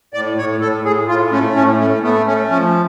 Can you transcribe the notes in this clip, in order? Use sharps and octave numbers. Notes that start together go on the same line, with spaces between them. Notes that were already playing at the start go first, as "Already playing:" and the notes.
A2 D5
A2 C#5
A2 A4
A2 G#4
A2 F4
A3 C#4
A2 C#4
A3 C#4
A3 B3
A3 C#4
F3 C#4